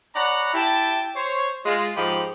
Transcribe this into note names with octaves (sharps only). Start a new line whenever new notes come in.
C#5 D5 F#5 A#5 B5
E4 G4 G5 A5
C5 C#5
G#3 F4
G#2 F3 D#4 G4 B5